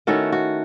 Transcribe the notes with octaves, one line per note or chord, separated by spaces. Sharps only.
D#3 A3 C#4 E4 F#4 A4
F#4